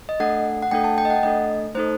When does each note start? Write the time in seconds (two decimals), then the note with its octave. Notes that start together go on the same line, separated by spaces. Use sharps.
0.09 D#5
0.20 A3 D4 A4 F#5
0.62 F#5
0.71 A3 D4 A4 G5
0.84 A5
0.98 G5
1.05 D#5
1.10 F#5
1.23 A3 D4 A4 D#5
1.75 A3 D#4 A4 C5